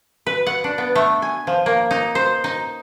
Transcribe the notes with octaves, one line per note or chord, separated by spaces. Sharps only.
B4
F#5
D4
B3
A3
G#5
F3
A#3
D#4
C5
D#4